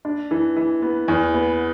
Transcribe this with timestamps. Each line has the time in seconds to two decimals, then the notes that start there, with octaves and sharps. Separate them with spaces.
0.05 D4
0.31 E3
0.56 E3
0.82 B3
1.08 E2
1.34 B3